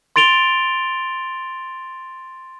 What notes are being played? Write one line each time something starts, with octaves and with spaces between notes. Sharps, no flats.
C6 A6 D7 F7 G7